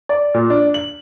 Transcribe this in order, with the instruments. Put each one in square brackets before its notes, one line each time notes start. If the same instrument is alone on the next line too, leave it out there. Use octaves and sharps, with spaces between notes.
[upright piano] D5
A#2
D4
F#7